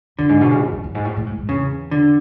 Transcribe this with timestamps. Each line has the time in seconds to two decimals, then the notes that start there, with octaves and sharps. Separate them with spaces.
0.18 F#2 D3
0.29 G#2
0.41 B2
0.51 C#3
0.61 F#2
0.72 F#2
0.84 F#2
0.95 G#2
1.05 A2
1.16 A2
1.27 G#2
1.38 G#2
1.48 E2 C#3
1.91 D3